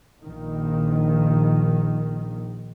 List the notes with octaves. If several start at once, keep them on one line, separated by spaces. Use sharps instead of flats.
A#1 D#3